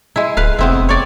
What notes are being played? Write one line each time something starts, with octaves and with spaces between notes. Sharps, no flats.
G#3 E4
D1 B4 F5
F1 B3 C4 E4
C#5 D5